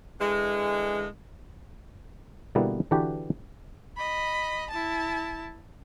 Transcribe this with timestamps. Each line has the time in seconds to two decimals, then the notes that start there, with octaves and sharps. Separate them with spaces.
0.21 D3 E3 G#3
2.55 B2 D3 G3 A#3 B3 E4
2.91 D3 E3 D4 F#4 G4 B4
3.97 D#5 B5
4.70 E4 A5